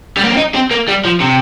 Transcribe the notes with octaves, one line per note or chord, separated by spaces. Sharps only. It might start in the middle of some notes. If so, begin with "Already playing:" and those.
G3
A#3
C4
D#4
C4
A#3
G3
F3
C3